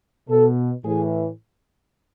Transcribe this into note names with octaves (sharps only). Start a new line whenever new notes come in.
B2 A4
A2 E3 G#4